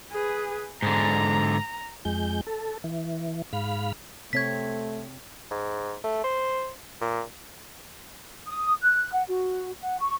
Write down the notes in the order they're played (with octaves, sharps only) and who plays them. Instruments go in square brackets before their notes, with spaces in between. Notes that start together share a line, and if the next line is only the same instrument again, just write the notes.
[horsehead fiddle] G#4 B4
[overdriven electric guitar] G#2 D3 [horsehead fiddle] A#5
[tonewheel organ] F2 G#3 G6
A4
E3
G#2 F5 B5
[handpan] C3 C4 C#5 [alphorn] A3 [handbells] G#6 B6
[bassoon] G#2
A3
C5
A#2
[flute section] D#6
F#6
F#5
F#4
F#5
C#6